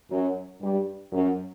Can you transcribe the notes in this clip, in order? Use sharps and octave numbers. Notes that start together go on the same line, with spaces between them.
F#2 F#3
G2 G3
F#2 F#3